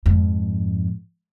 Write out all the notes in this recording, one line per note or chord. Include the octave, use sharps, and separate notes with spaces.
F2 G#2